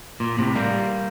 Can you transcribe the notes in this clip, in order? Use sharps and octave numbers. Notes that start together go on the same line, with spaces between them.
A#2
A2 C3
G3 A#3